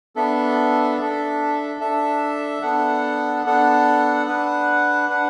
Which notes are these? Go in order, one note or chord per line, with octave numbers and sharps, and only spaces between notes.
B3 D4 A4 E5
D4 A4 E5
D4 A4 E5
B3 D4 A4 F#5
B3 D4 A4 F#5
D4 B4 F#5
D4 B4 F#5